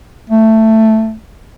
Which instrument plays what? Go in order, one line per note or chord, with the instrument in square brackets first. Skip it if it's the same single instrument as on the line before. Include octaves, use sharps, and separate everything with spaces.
[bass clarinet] A3